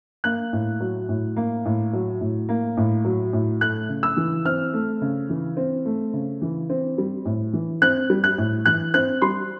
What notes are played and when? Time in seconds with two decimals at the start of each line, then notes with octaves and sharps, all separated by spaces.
0.24 A#3 F#6
0.53 A2
0.81 F#3
1.09 A2
1.36 A#3
1.65 A2
1.93 F#3
2.21 A2
2.49 A#3
2.77 A2
3.05 F#3
3.33 A2
3.61 A3 F#6
3.89 C#3
4.03 E6
4.17 E3
4.45 C4 F6
4.74 A3
5.01 C#3
5.29 E3
5.57 C4
5.85 A3
6.13 C#3
6.42 E3
6.70 C4
6.98 G3
7.25 A2
7.53 E3
7.82 C4 F#6
8.10 G3
8.24 F#6
8.38 A2
8.66 E3 F#6
8.94 C4 F#6
9.22 G3 C6